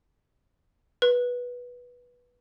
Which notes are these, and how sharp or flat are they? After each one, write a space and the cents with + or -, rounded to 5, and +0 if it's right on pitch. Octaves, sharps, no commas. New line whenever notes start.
B4 -10